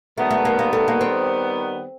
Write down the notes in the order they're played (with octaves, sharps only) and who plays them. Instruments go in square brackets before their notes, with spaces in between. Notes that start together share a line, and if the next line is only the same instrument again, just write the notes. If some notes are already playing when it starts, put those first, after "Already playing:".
[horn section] D#3 G3 B3 [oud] A3
[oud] A3
A#3
A#3
A3
A#3
C4